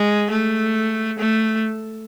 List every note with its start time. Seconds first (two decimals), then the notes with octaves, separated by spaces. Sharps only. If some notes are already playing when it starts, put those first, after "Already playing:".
Already playing: G#3
0.30 A3
1.19 A3